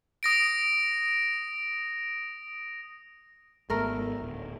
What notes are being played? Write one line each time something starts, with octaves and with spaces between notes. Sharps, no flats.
D#6 A#6 D7
G#1 G#2 A3 B3 A#4
D1